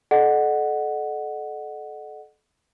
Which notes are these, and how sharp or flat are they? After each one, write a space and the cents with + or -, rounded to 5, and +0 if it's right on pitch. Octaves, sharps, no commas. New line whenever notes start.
A4 -30 D#5 -45 F#5 +0